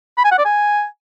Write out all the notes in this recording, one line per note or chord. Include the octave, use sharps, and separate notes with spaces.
B5
G#5
F#5
D5
G#5